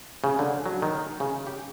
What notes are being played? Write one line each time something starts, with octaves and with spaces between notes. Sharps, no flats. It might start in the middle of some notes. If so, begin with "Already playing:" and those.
C#3
D3
F#3
D#3
C#3
G4